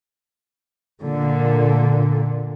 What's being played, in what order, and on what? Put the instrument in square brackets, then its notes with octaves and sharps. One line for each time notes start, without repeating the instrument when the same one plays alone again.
[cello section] A#2 D3